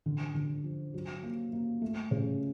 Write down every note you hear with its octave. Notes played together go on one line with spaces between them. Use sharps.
D3
D3
F3
F#3
A#3
A#3
A3
C#3